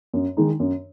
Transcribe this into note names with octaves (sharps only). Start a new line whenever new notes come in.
F#2
D#3 G#3 D#4
F#2